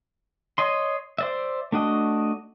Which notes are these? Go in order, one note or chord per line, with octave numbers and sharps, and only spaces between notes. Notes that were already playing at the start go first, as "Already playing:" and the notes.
C#5 D#5 C6
C5 D5 E5
A3 D4 F#4 D#5